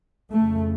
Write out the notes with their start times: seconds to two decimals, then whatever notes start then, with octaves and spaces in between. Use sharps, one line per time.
0.31 F2 C#3 A3